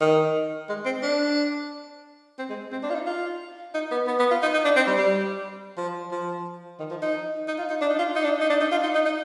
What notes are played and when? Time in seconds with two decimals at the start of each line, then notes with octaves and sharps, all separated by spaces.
0.01 D#3
0.69 G#3
0.86 C4
1.03 D4
2.39 C4
2.50 G#3
2.72 C4
2.83 D4
2.90 F4
2.95 D#4
3.07 F4
3.74 D#4
3.91 B3
4.07 B3
4.20 B3
4.31 F4
4.42 D#4
4.54 D#4
4.64 D4
4.76 C4
4.87 G3
4.98 G3
5.77 F3
6.12 F3
6.79 D#3
6.91 F3
7.02 D#4
7.48 D#4
7.58 F4
7.70 D#4
7.81 D4
7.90 D#4
7.99 F4
8.16 D#4
8.24 D4
8.40 D#4
8.50 D4
8.61 D#4
8.72 F4
8.83 D#4
8.94 D#4
9.06 D#4